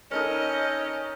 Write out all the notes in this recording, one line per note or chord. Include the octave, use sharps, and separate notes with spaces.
C#4 D#4 A4 A#4 D#5